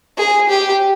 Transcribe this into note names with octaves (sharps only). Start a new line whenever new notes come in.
G#4
G4